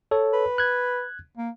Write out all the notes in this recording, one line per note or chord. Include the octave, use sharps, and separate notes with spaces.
A4 C#5
B4
F#6 G#6
A#3